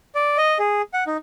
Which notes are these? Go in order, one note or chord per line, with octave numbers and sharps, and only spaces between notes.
D5
D#5
G#4
F#5
D#4